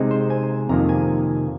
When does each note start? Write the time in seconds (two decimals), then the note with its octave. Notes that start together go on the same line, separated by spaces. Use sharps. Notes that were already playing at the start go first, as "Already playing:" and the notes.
Already playing: C3 G#3 C4 D#4
0.11 C5
0.30 G#5
0.69 F2 C3 D#3 A#3 A#5
0.89 G#5